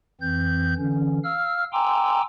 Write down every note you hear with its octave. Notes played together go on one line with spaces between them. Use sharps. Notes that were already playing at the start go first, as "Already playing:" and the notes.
F2 E3 C4 G6
D3 E3 C#4
F5 E6 F6
G5 G#5 A#5 C6 D6 E6